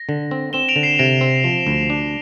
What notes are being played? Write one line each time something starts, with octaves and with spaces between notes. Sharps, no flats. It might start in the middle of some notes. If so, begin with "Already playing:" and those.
Already playing: A#6
D3
C4
C4 E7 G7
D7 F7
D3
C7 E7
C3 A#6 D7
C4
F3
D2
D4